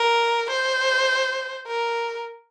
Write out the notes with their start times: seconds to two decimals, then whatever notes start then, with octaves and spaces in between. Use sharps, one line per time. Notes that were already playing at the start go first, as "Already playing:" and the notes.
Already playing: A#4
0.51 C5
1.67 A#4